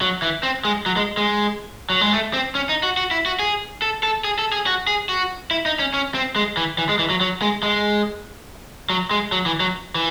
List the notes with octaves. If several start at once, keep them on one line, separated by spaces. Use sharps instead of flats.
F#3
E3
C4
G#3
F#3
G#3
G#3
F#3
G#3
A3
C4
C#4
D#4
F#4
F#4
E4
F#4
G#4
A4
A4
G#4
A4
G#4
F#4
G#4
F#4
E4
D#4
C#4
C#4
C4
G#3
E3
E3
G#3
E3
F#3
F#3
G#3
G#3
F#3
G#3
F#3
E3
F#3
E3